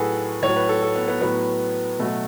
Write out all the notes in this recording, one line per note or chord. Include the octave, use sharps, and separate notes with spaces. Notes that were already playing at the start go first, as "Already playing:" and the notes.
Already playing: A2 F#3 F#4 G#4 A4 B4
A2 F#3 C#5
B4
A4
A4
B3
B3
A2 F#3 B3
B2 F#3 A3